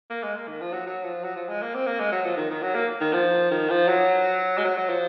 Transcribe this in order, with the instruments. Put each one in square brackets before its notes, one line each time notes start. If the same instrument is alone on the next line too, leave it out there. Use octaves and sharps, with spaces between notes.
[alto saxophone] A#3
G#3
A#3
D#3
F3
F#3
F#3
F3
F#3
F3
G#3
A#3
C4
A#3
G#3
F#3
F3
D#3
D#3
F#3
A#3
D#3
F3
D#3
F3
F#3
G#3
F#3
F#3
F3